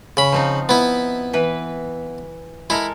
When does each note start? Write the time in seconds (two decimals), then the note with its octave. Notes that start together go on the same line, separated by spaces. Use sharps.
0.17 C#3 B5
0.32 F3 C4 D#4
0.69 B3 E4
1.33 E3 B4
2.70 G#3 E4 A4 A#4